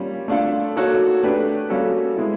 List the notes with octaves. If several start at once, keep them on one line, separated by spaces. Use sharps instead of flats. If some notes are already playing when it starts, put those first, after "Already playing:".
Already playing: G3 A#3 C#4 F4
A3 D4 F4 A4
A#3 D#4 F#4 A4 C#5
A3 D4 G4 B4
G3 A#3 C#4 F#4 A4
G#3 B3 E4